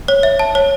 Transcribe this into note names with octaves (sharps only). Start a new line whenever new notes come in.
C#5
E5
A5
C#5